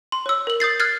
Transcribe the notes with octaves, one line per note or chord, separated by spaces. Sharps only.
C6
C#5 E6
A#4 F#7
D#6 G6 A6 C7
F6 F#6 G#6 A6 C7